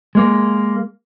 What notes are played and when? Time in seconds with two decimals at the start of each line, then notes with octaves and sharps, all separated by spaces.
0.15 G#3 A#3